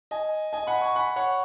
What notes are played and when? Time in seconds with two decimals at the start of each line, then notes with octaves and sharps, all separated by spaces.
0.11 D#5 G#5
0.53 D#5 G#5
0.67 F#5 B5
0.81 G#5 C#6
0.95 F#5 B5
1.16 C#5 F#5